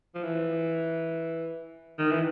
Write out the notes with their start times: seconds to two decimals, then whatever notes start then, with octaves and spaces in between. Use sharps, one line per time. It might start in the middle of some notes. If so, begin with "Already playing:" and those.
0.15 F3
0.23 E3
1.99 D#3
2.11 E3